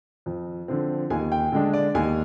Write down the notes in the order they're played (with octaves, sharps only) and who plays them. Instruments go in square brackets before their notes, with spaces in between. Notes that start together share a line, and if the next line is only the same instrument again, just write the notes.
[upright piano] F2
D3 F3 C4
D#2 G#5
G5
D3 G#3 D4
D5
D#2 G#5